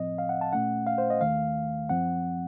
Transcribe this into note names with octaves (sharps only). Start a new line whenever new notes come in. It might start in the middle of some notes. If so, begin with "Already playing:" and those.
Already playing: A2 F3 C4 D#5
F5
F#5
A5
A#2 A3 C#4 F#5
F5
C5
D#5
D#2 D#3 A3 F5
F#2 F3 C4 F#5